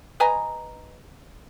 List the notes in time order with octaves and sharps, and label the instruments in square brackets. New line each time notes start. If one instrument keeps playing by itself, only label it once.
[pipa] B4 D#5 G#5 A#5